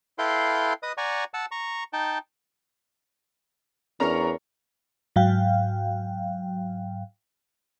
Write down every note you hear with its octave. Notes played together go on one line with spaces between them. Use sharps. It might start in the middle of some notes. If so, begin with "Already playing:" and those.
E4 A4 B4 F5 G5 C6
B4 D#5 D#6
D5 F#5 G#5 A#5 C#6
F#5 A5 E6
A#5 C#6
D#4 G5 A5
E2 C#4 D4 A#4 C#5 A#5
G#2 F#3 F5 G5